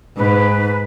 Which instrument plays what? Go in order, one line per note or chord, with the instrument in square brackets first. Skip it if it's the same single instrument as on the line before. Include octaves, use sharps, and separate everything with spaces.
[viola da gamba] G#2 [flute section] B4